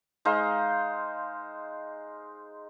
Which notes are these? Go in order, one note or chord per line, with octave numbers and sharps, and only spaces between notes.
G#3 D#4 C5 F5